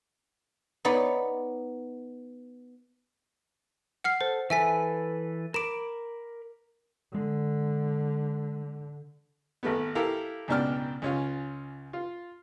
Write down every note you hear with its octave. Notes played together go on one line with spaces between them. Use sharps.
B3 D#4 C#5 D5 B5
F#5 F6 C7
A4 C5
E3 A4 B4 E5 G#5 B6
A#4 B5 D6 D7 E7
D3 G#3
G#1 A3 B3
E4 G4 A4 A#4 F5
C#2 G#2 B2 D4 G5 F6
C#2 C#4 F4
F4